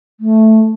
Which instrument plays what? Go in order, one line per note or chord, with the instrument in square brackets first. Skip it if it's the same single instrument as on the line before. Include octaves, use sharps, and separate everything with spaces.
[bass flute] A3